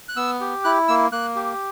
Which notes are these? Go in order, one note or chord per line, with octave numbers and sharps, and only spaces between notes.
F#6
B3 E6
G4
E4 F#6
A#3 E6
A#3 F#6
G4